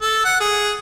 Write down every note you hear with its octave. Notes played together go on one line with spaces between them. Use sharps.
A4
F#5
G#4